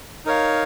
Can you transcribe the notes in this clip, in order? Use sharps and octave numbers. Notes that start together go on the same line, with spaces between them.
D#4 A#4 C#5 F5